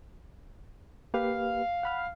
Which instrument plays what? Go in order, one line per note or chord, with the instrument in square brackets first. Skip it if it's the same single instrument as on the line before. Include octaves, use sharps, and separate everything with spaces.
[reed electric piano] A#3 G4 B4 [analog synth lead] F5
[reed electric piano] F#5 B5 F6